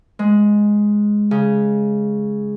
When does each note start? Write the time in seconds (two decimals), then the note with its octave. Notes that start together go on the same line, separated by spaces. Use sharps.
0.19 G#3
1.31 C#3